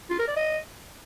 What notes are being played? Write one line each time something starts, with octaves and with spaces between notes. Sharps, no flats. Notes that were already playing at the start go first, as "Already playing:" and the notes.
F4
A#4
D5
D#5